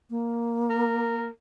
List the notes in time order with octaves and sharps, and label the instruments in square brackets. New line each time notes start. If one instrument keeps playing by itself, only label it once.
[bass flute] A#3
[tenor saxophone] A#4